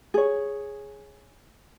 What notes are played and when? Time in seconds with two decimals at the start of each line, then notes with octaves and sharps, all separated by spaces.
0.14 G#4 C#5